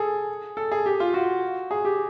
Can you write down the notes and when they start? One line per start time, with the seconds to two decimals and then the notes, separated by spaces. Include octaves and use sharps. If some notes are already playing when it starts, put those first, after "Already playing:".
Already playing: G#4 A4
0.57 A4
0.72 G#4
0.86 G4
1.00 F4
1.14 F#4
1.71 G#4
1.85 G4